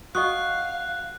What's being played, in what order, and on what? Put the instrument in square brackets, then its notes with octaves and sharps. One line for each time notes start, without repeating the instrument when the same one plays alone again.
[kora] F#4 [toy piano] D#5 C#6 D#6 [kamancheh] F5 [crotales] F#6